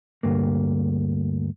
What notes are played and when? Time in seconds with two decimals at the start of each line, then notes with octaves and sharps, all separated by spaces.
0.23 D2 G2 A#3